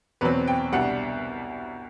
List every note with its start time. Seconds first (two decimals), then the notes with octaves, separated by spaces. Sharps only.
0.21 E2 B2 F#3 C4 B4
0.48 G5
0.72 C2 B2 G3 D4 F#5